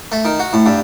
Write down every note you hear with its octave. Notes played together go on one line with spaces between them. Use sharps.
A3
D#3
F#4
A2
G2